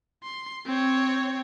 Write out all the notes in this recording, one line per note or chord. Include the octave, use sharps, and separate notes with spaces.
C6
C4 C#5